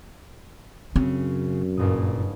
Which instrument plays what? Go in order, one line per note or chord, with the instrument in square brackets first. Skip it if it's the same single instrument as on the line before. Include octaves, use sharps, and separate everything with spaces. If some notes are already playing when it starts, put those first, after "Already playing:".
[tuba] F#2 [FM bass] C#3 [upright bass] C4
[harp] F#1 G2 D#6 [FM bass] A#2